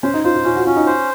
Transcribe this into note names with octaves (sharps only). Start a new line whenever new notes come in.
C#4 C5
D#4
F4 C5
F4
C#4 F4
F#4
C#4 F4
D#4
C5